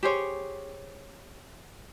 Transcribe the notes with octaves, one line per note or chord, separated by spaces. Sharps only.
G4 G#4 C5 C#5